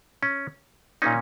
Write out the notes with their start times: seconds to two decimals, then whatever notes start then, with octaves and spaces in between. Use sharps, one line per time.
0.23 C#4
1.02 A#2 A#3 C#4 D#4